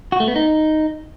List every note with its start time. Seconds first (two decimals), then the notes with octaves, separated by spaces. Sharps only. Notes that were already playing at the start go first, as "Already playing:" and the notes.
0.12 F#4
0.20 A3
0.28 B3
0.36 D#4